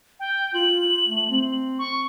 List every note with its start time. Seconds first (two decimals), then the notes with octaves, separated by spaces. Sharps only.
0.20 G5
0.54 F4 F#7
1.06 A3
1.30 C4
1.79 C#6